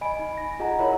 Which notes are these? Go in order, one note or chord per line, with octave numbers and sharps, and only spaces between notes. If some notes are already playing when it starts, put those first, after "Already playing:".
D#5 G#5 B5 D7
D#4
A#6
F4 G#4 D#5 F#5 G#5 A#5
E4 A#4 C#5 E5 B5